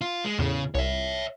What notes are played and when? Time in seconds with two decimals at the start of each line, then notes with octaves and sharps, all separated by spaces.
0.01 F4
0.24 G#3
0.39 E2 A2 C#3
0.75 C2 C#5 E5